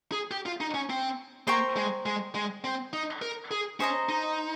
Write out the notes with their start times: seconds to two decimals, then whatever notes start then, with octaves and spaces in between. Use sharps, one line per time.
0.12 G#4
0.31 G4
0.46 F4
0.60 D#4
0.74 C#4
0.90 C4
1.47 A#3 C5 G5 A#5 C#6
1.76 G#3
2.06 G#3
2.35 G#3
2.64 C4
2.93 D#4
3.22 A#4
3.51 G#4
3.80 C#4 C5 D#5 A#5
4.09 D#4